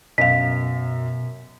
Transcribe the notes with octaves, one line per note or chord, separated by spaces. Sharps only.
F#2 B2 D#5 F5 B6